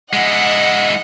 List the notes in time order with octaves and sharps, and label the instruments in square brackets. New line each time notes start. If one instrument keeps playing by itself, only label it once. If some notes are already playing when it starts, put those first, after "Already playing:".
[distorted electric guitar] G#3 E4 [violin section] D#5 F#5